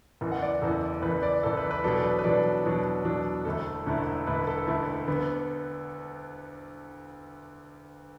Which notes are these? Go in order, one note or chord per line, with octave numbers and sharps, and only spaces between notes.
F#1 E2 E3
F#5
D5
F#1 E2 E3 A4
F#1 E2 E3 B4
D5
F#1 E2 E3 A4
B4
B4
E2 B2 F#3 D4 A4
D5
B4
B4
E2 B2 F#3 D4 D5
E2 B2 F#3 D4
E2 B2 F#3 D4
E1 D2 D3 A3 E4 A4
E1 D2 D3 A3 E4
E1 D2 D3 A3 E4 B4
A4
E1 D2 D3 A3 E4
D2 D3 B3